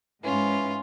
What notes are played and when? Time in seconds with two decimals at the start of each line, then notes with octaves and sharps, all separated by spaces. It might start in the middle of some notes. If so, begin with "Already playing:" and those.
0.24 G#2 E3 C#4 F4